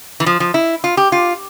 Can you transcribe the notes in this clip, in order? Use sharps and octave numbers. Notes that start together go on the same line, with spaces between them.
E3
F3
F3
E4
F4
G4
F4